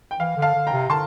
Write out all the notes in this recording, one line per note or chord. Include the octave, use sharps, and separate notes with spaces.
G5
E3 F5
D3
F5 A5
D3
G5 A#5
C3
D3 A5 C6